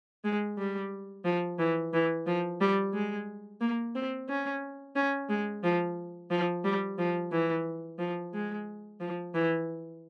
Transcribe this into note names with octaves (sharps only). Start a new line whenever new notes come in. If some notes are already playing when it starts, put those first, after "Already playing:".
G#3
G3
F3
E3
E3
F3
G3
G#3
A#3
C4
C#4
C#4
G#3
F3
F3
G3
F3
E3
F3
G#3
F3
E3